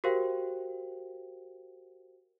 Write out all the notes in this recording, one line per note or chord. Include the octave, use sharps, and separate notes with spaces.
F#4 G4 A#4 C5 F5 G5